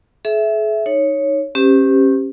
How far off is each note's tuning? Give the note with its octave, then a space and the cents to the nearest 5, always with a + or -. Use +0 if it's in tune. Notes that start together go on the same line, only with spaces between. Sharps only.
G#4 +45 E5 +0
D#4 +0 C#5 +0
C#4 -30 G4 +0 C5 -45